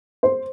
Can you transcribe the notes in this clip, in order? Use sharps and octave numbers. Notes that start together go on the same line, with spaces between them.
C5